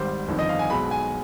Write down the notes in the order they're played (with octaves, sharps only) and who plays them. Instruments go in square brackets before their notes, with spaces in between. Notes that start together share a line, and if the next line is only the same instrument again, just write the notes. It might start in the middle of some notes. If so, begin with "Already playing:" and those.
Already playing: [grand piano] G#1 G#2 G3 C5
G1 F2 D#3
D#5
F5
G#5
B1 B2 G#3 B5
G#5